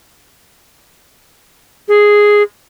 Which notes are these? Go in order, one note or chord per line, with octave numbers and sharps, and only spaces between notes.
G#4